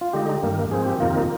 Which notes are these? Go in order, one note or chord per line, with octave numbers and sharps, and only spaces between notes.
F4
D3 G#3 D#4 G4
G2 D#3 A#3
G#2 F3 C4 G#4
G4
F2 C3 D#3 A#3 D#4 F4